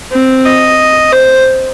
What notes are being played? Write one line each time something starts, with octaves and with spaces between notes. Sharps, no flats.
C4
D#5
C5